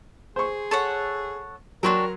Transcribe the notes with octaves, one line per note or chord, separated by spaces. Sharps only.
G#4 C5 C#6
A4 C#5 F#5
F#3 D4 F#4 A#4 G5 C6